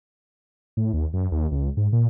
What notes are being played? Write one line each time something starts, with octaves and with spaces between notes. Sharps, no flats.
A2
D#2
F#2
D#2
C#2
G#2
A#2